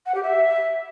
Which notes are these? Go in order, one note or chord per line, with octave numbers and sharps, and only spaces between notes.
F#5
G4
E5